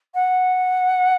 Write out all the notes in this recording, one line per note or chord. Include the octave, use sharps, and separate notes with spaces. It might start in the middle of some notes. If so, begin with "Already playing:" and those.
F#5